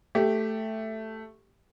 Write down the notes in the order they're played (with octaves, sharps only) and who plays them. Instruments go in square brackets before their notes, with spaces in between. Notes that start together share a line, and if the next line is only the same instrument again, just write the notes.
[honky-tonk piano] A3 [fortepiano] G4